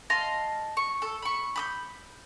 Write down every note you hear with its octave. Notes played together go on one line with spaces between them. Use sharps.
D#5 F5 A5 C6
C#6
A4
B5 C#6
B5 D#6 G6